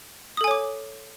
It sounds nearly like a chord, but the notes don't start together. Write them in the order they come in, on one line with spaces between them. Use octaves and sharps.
D#6 A4 G#5 C#5 D6